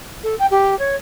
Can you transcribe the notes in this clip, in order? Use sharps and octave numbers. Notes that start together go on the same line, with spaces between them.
A4
G5
G4
C#5